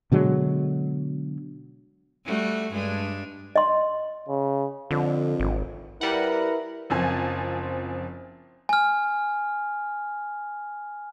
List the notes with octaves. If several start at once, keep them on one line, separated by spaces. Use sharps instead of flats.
B2 D3 F#3 G#3
G3 A3 F#4
G2 G#3 D4
D#5 C6
C#3
F2 D3
G#1
G3 E4 A#4 B4 F#5
F#1 F3 C4 G#5
G#5 F6